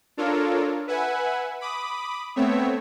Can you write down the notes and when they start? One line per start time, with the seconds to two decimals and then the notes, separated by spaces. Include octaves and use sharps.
0.17 D4 F4 A4 A#4 C#5
0.87 B4 E5 F#5 G#5
1.61 B5 D6 D#6
2.36 A3 B3 C4 C#5 E5